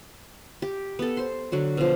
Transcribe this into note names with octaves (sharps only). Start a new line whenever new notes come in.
G4
B3 A4
C5 C6
D3 F#3 F#4
B2 F3